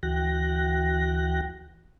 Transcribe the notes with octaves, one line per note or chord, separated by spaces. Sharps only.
D2 E3 F#4 G5 F#6 A#6